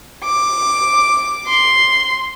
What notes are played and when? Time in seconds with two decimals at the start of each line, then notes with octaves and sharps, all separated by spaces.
0.24 D6
1.47 C6